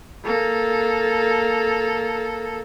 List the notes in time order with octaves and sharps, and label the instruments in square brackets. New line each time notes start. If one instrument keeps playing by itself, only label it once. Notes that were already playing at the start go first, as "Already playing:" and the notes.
[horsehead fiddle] A#3 A4